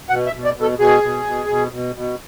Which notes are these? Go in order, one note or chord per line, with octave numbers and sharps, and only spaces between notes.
B2 F#5
E5
B2
D5
B2
A4
B2 G#4
B2
B2
B2
B2
B2